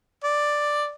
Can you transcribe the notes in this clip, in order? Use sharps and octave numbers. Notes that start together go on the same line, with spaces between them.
D5